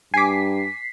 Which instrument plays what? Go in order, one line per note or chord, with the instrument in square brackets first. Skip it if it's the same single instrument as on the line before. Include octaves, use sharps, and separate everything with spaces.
[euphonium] G2 [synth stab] G#5 D6 [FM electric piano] B6 C7